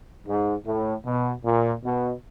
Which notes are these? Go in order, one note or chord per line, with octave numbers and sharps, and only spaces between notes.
G#2
A2
B2
A#2
B2